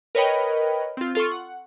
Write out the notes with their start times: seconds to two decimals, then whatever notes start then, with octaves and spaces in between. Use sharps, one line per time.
0.15 A#4 B4 C#5 D#5 G5 B5
0.97 C4 F4
1.15 F4 A4 C6 C#6
1.31 F#5